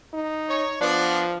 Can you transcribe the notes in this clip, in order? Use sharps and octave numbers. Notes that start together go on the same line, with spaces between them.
D#4
C#5
F3 B3 D4